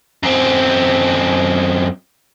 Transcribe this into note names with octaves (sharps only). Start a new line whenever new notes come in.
F#2 C4